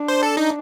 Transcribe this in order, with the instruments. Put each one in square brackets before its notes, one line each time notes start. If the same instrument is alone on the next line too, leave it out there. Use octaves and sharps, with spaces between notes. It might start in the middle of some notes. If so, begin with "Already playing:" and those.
Already playing: [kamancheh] D4
[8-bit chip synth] C5
A4
D#4